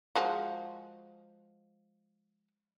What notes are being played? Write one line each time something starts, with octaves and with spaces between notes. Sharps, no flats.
F3 G#3 F#4